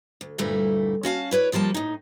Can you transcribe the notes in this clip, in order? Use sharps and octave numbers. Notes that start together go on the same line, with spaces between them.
D2
D2 G2 A#2 G3 A3 E4
C#4 F#4 F5 A5
E4 B4 C#5 D5
D#2 F3 G3 A#3 A5
A2 D#4